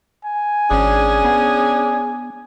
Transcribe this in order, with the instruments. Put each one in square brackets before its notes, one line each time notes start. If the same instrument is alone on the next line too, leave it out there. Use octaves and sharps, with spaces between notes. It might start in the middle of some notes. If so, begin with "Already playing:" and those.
[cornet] G#5
[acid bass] G#1 [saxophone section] C#4 D4 G#4
[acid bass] B3